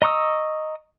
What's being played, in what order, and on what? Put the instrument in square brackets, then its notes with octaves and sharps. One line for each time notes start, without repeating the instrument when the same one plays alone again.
[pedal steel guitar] D#5 A#5 C#6 D#6 E6